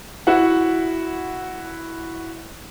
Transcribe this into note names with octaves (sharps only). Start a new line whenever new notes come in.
E4 F#4 F#5